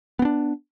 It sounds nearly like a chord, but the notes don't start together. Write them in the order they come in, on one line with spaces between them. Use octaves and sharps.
B3 C4 D4